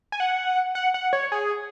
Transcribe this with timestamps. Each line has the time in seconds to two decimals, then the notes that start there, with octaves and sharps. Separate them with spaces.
0.12 G#5
0.20 F#5
0.75 F#5
0.94 F#5
1.13 C#5
1.32 G#4